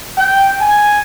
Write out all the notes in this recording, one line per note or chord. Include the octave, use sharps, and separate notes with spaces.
G5
G#5